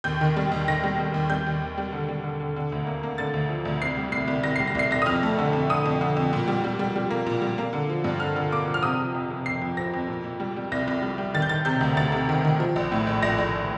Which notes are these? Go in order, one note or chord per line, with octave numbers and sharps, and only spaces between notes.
D#2 G6
D#3
G3
D#2
D#3 A#6
G3
G3
D#2
G3 G6
D#2
D#2
G3
D3
G3
D3
D3
D3
D2
A#3
A#3
D3 A6
D2
F3
D2
C2 C7
G3
C2 C7
C2
C2 A#6
G3 C7
A#6
C2 C7
C2 A#6
D#6
F2 F6
A3
D3
F2
D3 D#6
F2
D3
F2
A#2
G3
G3
G3
G3
A#3
A#2
G3
A#3
D3
F3
G2
D3 F6
D3
A#3 D6
F3
F6
C3 D#6
F3
F2
C3
F2 C7
F2
F3 A#6
F2
A#2
A#2
G3
G3
C2 A#6
C2
G3
G3
D#3 A6
G6
D#3 A6
C3 G6
D2
D2 A6
C3
D#3
D#3
F3
A#1
A2
A#1
A#1 A#6
A#1